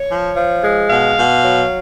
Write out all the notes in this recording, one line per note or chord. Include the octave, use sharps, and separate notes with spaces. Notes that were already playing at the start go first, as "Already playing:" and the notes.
Already playing: C#5
F3
F3
G#3
B2 F5
B2
F#3